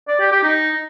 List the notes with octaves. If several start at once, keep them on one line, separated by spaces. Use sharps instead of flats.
D5
G4
G4
D#4